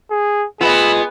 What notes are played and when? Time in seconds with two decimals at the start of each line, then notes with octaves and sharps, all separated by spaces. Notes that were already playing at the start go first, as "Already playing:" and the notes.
0.11 G#4
0.61 B3 F4 G#4 B4 D#5 B5 E6